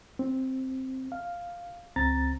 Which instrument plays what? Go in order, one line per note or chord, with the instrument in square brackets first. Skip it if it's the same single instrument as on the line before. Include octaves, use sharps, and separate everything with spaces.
[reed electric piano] C4
F5
C#2 C4 A#5 A6